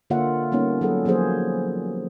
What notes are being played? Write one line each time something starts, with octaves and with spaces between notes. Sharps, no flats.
D3 A#3 F4 C#5 E5 F#5
G3 A#3 B3 C#4 D#4 C#5
F#3 G#4 A4 B4 F#5
F3 F#3 A#3 B3 G#4 C5